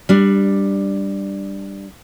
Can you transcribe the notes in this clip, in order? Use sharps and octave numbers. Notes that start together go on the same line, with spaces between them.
G3 D4